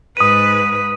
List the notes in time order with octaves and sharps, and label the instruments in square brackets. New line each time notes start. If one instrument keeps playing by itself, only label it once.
[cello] G#2 B4 [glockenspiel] D#6 D#7